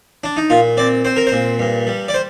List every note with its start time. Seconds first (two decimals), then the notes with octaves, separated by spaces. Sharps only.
0.24 D4
0.37 D#4
0.50 A#2 F4
0.77 C4 D5
1.05 C4 C5
1.16 A#4
1.27 C5
1.32 A#2
1.59 G2
1.87 G3
2.08 D5
2.14 C5